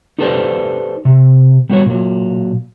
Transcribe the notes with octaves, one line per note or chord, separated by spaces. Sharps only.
D#4 G4 A4 B4 C5 D5
C3
G3 B3 F#4 C5 C#5
A#2 F#3